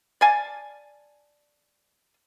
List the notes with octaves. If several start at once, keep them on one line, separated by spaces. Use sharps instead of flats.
D5 F5 G#5 A5